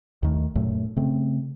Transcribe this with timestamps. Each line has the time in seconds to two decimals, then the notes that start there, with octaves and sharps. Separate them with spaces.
0.23 D#2 D#3 A3
0.55 F#2 A#2 F#3 A3
0.96 C#3 A3 C4